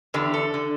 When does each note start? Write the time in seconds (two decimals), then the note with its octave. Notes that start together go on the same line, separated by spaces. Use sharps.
0.14 E2 D3 G4
0.34 A4
0.54 D3